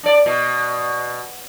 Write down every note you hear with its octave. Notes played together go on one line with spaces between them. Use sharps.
D4 D5
B2